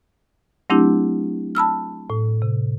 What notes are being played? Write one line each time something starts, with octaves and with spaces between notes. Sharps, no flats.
F#3 A3 C4 D4 E4 G4
A5 B5 E6 F6
A2
C3